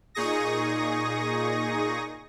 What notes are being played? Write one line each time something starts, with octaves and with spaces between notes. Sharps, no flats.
A#2 D#4 G#4 C#6 D#6 A#6